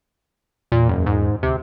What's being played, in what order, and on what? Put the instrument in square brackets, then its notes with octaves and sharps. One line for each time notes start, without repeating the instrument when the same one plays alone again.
[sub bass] E2 [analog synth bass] A#2
[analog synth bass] F#1
G#2
[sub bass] D2 [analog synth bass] C3